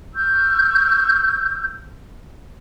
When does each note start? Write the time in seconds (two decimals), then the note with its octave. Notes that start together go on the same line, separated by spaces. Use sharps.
0.14 C#6 E6 F6 G6